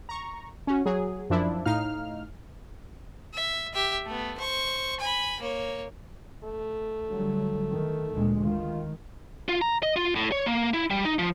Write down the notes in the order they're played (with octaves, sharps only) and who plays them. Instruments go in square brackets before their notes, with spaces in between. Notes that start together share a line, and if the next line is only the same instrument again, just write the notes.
[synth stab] A#5 C#6
C#4 F#4
F#3 G#4
F#2 F3 D4 E4
A2 D#4 F5 F6
[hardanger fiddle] E5
G4 E5
A3 B3
C5 C#6
G#5 B5
A#3 C#5
[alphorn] A3
[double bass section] D3 F#3 G3
D#3
D2 A#2 G#3
[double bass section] D#3 [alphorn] F4
[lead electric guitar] F4
A#5
D#5
F4
A2
C#5
A#3
E4
G3
D#4
F3